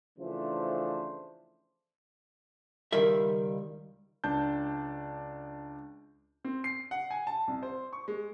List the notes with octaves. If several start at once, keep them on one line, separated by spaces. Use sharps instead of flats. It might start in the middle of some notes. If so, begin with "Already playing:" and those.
C#3 E3 F3 A3 D4 C5
C#2 D#3 G3 F4 A#4 E5
C#2 D4 A5 G6
C4
C7
F#5
G#5
A5
C2
C5
C#6
G#3